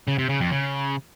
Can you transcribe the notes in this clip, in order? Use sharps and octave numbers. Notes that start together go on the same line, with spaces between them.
C#3
C3
C#3
F2
C#3